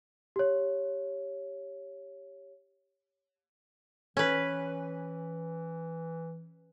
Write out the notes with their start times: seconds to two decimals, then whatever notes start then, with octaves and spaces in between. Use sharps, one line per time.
0.36 G4 C#5
4.17 E3 C#4 B4